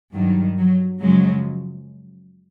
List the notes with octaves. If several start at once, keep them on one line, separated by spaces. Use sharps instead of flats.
G2 D#3 F#3
F#3
F#2 C#3 F3 F#3 G#3